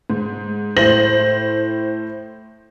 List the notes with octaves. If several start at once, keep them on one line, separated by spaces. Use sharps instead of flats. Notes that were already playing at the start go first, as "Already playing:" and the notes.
G#2
A2 C5 A#6 F#7